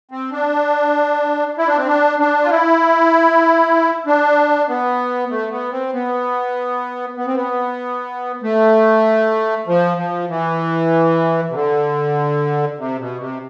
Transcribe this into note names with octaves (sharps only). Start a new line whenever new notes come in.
C4
D4
E4
D4
C4
D4
D4
F4
E4
D4
B3
A3
B3
C4
B3
B3
C4
B3
A3
F3
F3
E3
C3
D3
C3
B2
C3